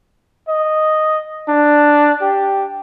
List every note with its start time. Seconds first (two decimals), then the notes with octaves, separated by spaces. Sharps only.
0.49 D#5
1.48 D4
2.22 G4